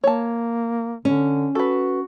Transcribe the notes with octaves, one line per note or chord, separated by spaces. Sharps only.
A#3 C#5 A5
D3 C#4
F#4 A4 B4